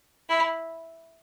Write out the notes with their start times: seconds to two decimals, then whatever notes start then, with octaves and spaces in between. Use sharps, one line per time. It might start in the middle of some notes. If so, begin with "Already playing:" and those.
0.29 E4